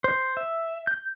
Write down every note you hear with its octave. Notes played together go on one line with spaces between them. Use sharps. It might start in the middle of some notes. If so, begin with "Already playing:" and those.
C5
E5
G6